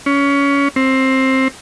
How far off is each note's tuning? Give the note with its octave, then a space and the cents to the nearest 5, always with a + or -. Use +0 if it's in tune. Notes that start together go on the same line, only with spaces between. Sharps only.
C#4 +25
C4 +15